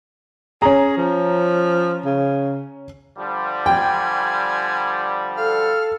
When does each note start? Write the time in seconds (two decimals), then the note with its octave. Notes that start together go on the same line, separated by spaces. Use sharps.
0.62 C#4 G#4 A#5
0.97 F3
2.05 C#3
3.18 D3 F3 G3
3.66 G5 G#5
5.37 A4 F5